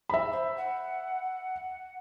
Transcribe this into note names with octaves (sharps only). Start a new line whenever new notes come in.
E5 B5
C5
F#5